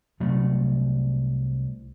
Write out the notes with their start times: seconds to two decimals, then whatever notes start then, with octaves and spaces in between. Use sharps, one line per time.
0.20 C2 C3 F#3 A3